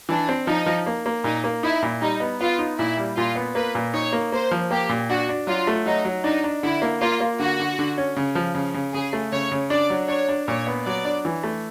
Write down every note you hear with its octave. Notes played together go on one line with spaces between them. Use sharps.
E3 D4
C4
F3 D#4
F3
A#3
A#3
A#2 D#4
A#3
D#4 E4
A#2
G3 D#4
B3
B3 F4
D#4
A#2 E4
G3
A#2 F4
B3
A#3 B4
A#2
D#4 C#5
A#3
A#3 C5
F3
A#3 G4
A#2
D4 F#4
D4
F#3 F4
A3
F#3 D#4
F#3
D4 D#4
D4
D3 E4
A#3
A#3 F4
A#3
D3 F#4
D3
D3
C#4
C#3
F3
C#3
C#3
C#3 G#4
A3
C#3 C#5
C#3
D4 D5
F#3
D4 C#5
D4
A#2 C#5
B3
F#3 D5
D4
E3
A3